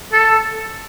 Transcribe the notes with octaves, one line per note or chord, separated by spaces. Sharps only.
A4